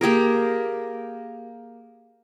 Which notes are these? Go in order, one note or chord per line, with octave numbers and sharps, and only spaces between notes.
A#3 G4 G#4 A#4